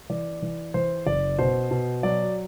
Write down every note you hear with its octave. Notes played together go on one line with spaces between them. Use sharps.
E3 D5
E3
E3 C5
F#1 D5
B2 C5
B2
F#3 D5